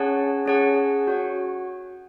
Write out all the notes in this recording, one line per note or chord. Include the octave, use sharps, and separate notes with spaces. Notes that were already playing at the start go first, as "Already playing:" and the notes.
Already playing: C#4 G#4 C#5 F#5 A5
C#4 G#4 C#5 F#5 A5
F#4 C#5 F#5